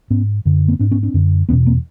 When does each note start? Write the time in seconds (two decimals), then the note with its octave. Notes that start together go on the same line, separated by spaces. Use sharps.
0.10 G#2 B3 C#4
0.45 F#2 D3
0.68 A#3 C4
0.79 G#2 C4 D4
0.91 B3 C#4
1.03 C4 D4
1.14 F#2 D3
1.49 E2 B3 C#4
1.53 B2
1.66 A#3 C4